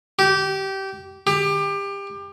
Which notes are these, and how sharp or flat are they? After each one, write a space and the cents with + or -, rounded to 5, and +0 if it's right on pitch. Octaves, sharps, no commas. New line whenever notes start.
G4 -20
G4 +25